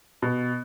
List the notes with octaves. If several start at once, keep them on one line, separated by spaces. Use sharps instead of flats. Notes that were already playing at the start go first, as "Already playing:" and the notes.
B2